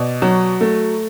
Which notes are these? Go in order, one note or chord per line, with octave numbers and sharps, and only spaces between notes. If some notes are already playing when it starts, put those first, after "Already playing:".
Already playing: B2 D5
F#3
A3